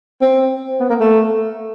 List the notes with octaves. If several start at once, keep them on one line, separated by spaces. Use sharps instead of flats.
C4
B3
A#3
A3